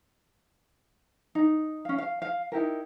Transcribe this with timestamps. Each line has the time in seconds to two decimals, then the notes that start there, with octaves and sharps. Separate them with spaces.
1.35 D#4
1.85 C#4 F5
1.98 F5
2.22 F5
2.52 D#4 E4 G4 A#4